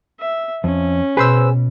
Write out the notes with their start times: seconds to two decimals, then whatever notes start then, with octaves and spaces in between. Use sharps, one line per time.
0.20 E5
0.64 F2 C#4
1.17 B2 G#4 B4 C5 E6